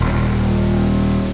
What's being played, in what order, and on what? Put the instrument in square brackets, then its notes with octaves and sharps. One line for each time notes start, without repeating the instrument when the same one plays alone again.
[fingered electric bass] D#1